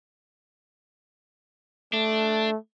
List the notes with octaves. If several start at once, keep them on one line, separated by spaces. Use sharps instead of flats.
A3 D4